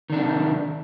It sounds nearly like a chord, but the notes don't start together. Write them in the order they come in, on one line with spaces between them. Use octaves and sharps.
D#3 D4 C3